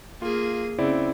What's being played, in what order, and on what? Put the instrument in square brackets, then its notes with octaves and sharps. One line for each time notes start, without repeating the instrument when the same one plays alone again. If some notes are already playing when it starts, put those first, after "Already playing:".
[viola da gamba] A#3 G#4 [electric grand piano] F4
[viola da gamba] C#3 [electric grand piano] C4 E4 D5